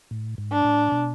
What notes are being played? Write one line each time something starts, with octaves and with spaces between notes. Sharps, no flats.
A2
G#2
D4
A2
B2